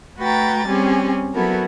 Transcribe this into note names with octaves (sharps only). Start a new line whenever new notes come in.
A3 F#4 B4 G5 A#5 A6
G3 C4 C#4 G4 G#4
F#3 B3 E4 F#4 A4 A#4